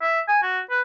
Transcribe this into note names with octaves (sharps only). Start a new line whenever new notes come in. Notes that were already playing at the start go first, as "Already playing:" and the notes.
E5
G#5
F#4
B4